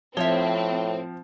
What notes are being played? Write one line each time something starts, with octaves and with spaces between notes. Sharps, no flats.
A2 F3 C4 C#5 E5 G7